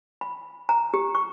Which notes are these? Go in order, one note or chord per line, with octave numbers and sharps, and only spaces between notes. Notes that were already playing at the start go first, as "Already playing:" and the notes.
B5
A#5
G4
C#6